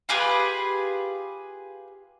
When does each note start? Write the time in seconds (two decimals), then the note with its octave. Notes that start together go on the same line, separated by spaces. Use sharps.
0.09 F4 G4 G#4 B4